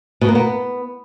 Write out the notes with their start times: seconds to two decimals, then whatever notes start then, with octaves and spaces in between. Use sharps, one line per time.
0.21 B2
0.28 A#3
0.35 B3